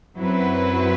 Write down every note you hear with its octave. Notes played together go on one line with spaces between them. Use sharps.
F#2 F#3 C4 E4 B4